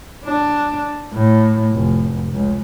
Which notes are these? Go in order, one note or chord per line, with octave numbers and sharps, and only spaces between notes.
D4
A2
F1
C#2